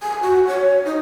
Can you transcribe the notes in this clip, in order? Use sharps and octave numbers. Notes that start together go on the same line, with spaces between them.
G#5
F#4
C#5
D#4